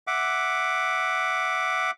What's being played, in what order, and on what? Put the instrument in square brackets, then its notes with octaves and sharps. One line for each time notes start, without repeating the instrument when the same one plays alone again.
[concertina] E5 F#5 D6